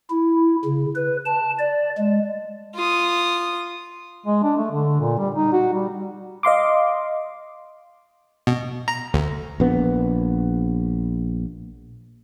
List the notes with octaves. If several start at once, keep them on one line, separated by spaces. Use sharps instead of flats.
E4
C#3
B4
A5
D5
G#3
F4 D#6
G#3
D4
A3
D3
A#2
G3
D#4
F#4
G3
D#5 F5 C6 D6
B2
A#5
D2
A#1 B3